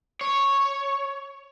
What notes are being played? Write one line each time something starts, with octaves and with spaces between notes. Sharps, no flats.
C#5